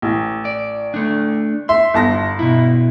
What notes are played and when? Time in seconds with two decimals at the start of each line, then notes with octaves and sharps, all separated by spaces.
0.02 A1
0.45 D5
0.94 A3 D4
1.69 E5 C6
1.94 G1 A5 A#6
2.39 B2 E4